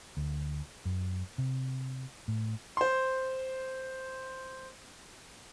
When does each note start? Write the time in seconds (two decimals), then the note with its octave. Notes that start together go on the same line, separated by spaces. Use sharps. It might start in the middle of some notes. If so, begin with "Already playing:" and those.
0.17 D2
0.85 F#2
1.38 C3
2.28 A2
2.77 C5 C6